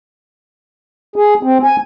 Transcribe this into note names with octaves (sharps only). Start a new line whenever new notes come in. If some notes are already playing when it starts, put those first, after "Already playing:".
G#4
C4
G#5